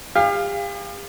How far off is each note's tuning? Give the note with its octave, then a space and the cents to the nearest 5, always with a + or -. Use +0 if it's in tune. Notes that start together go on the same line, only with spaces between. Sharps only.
G4 +45 F5 +0